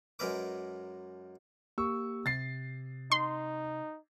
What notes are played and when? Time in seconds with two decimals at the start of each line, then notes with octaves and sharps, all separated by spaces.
0.19 F#2 G#3 A#4 B4 D6
1.78 A#3 G4 C#6 E6
2.26 C3 A6 C7
3.12 D#4 C6